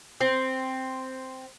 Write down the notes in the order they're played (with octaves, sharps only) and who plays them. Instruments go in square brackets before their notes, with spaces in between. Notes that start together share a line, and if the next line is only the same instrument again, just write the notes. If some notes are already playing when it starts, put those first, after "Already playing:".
[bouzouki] C4